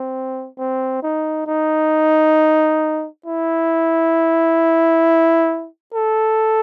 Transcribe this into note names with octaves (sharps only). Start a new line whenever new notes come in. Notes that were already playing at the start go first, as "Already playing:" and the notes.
Already playing: C4
C4
D#4
D#4
E4
A4